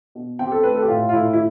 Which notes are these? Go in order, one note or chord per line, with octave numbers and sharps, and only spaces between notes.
B2
C4 G5
G4
A4
A3 B4
A4
G4
A2 F4
F4
A2 E4
E4